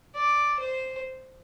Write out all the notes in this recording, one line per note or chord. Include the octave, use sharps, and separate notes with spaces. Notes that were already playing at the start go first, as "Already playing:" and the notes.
D5
C5